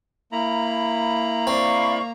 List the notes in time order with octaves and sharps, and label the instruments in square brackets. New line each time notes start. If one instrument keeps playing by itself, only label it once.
[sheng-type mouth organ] A#3 A#5 [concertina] E4 B5
[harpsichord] C4 [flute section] D5 F5 C#6